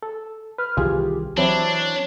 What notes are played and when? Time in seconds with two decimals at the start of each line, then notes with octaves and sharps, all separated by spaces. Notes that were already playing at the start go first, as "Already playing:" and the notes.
0.03 A4
0.58 B4 F6
0.77 C2 D#3 E3 F4 G4 G#4
1.37 E3 F#3 C4 D4 E4 C#5